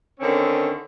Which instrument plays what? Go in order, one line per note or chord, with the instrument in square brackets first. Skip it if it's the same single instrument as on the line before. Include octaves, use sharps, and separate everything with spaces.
[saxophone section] D3 D#3 C4 C#4